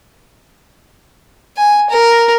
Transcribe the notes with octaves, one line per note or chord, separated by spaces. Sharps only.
G#5
A#4